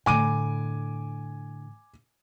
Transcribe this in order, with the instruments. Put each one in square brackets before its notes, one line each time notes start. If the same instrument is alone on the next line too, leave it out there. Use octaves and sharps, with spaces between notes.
[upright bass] A2 D3 [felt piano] G#5 D6 D#7